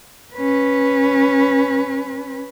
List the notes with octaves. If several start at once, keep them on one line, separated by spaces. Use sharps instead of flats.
C#4 B4